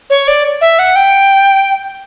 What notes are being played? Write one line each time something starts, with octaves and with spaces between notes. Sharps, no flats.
C#5
D5
E5
F#5
G5